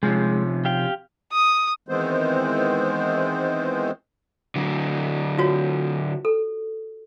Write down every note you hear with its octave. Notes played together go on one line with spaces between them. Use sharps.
C3 F3 G#3 C#4
G4 F5 G5
D#6
D#3 E3 G#3 B3 C4 C5
D3 F#3
F4 F#4 C#5
A4